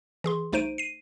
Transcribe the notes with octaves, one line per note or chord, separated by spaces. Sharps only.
E3 G#4 C6
C2 A3 D#4 C5 D7 D#7
C7 D#7